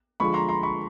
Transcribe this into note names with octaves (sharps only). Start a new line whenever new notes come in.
D3 F3 G#3 B5 C#6
A#5 C6
A#5 C6
B5 C#6